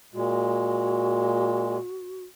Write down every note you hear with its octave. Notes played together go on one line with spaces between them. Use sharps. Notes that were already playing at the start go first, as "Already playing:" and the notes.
A#2 G#3 F#4